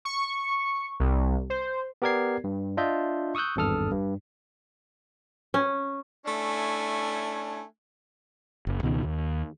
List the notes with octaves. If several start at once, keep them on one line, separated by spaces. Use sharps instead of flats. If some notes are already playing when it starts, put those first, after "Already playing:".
C#6
C2
C5
B3 G4 A#4 D5 G#6 C7
G2
D4 F4 D#5 E5 G6
C#6 D#6 E6 F#6 G6
G#1 E2 G2 A4 D#6 F6
G2
C#4
A3 C#4 D4 E4 G#5
F#1
C#2 B2 D#3
D#2